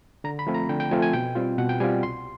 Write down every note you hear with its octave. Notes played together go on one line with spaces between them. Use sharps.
D3 A#5
B5
F3 A3 C4 F4
A#5
D3 G5
G5
F3 A3 C4 F4 G#5
G#5
B2 G5
G3 C4 F4
B2 F#5
G5
G3 C4 F4 G#5
C2 C6